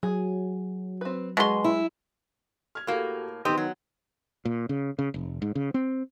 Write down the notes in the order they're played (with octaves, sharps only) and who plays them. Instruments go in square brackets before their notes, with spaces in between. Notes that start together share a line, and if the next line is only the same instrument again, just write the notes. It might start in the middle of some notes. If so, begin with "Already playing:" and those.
[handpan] F#3 [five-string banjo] G#4
[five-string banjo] C4 B4
[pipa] B2 C6 [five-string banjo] G#3 G#4
[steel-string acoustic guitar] E4
[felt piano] F6 G#6
[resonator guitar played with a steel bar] A2 A#3 [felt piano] F#4 G4 A4
[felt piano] D#3 B3 D#4 [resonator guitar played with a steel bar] C4 G4 D#5
[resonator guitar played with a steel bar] F#3
[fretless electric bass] A#2
C#3
C#3
F1
G#2
C#3
C4